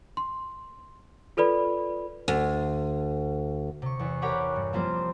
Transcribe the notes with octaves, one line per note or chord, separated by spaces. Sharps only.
C6
F4 A4 B4 D5 B5
D2
C3 C#6
E2
G4 A#4 C#5 F#5 B5 D6
G2
F3 G3 A#3 C4 F4 C5